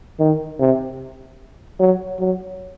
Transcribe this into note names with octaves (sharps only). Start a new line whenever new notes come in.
D#3
C3
F#3
F#3